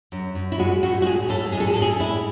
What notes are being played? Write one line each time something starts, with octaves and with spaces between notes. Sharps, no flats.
F#2
F#2
E4
G#3 F#4
A2 F#4
F#4
G#3 G#4
A2 A4
G#3 G#4
A4
G#4
A2 A4
G#4
G#3 E4